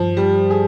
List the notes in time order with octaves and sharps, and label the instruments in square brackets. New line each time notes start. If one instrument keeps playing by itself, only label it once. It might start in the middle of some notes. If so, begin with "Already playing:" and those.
Already playing: [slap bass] G2 [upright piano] F3
[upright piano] G3
G#4